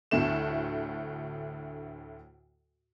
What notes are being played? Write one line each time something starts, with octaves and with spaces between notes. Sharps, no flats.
D2 A2 D3 A3 E7